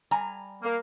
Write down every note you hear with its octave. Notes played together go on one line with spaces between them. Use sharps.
G3 G#5 A#5
A#3